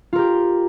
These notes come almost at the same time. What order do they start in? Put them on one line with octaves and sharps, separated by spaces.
F4 A#4 G4